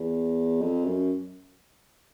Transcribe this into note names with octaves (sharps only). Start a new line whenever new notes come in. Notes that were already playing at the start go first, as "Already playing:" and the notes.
Already playing: E2
F2
F#2